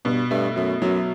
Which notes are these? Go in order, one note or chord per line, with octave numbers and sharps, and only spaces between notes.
G2 B2
G2 A3
F#2 A3
F#2 F#3